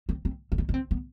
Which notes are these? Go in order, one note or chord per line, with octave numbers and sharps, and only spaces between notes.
C4
C4
C4
D#4
D#4
C4
B3